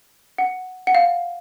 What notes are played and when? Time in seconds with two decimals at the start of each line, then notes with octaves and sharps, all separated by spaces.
0.38 F#5
0.87 F#5
0.95 F5